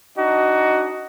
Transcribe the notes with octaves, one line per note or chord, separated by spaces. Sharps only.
D4 D#4 F#4 D#5